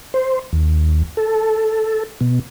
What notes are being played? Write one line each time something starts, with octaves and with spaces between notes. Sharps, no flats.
C5
D#2
A4
B2